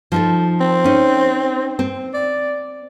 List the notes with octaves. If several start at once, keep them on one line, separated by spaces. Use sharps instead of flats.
F3 D#4 A4
C4
C#4 D#4
C4
D5